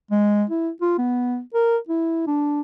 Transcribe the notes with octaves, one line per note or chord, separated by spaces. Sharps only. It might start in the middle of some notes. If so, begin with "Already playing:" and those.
G#3
E4
F4
B3
A#4
E4
D4